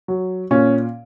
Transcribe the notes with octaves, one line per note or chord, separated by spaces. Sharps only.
F#3
A#2 C#4